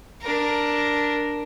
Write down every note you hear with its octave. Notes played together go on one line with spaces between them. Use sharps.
D4 A#4